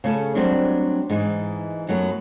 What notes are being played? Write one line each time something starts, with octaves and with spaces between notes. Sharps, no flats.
C#3 A3 C#4 A4
F#3 G3 A3 C4 D4
G#2 E3 D#4
F#2 F#3 A3 B3